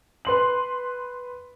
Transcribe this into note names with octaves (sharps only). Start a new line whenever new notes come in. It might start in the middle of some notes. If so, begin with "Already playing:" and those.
B4 C6 F#7